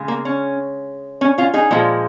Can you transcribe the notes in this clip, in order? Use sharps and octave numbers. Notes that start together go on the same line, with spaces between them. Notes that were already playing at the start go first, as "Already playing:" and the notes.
Already playing: C#3 G#3
A#3
C#4
C#4
C#4 F4
D#4 G#4
A#2 F3 G#3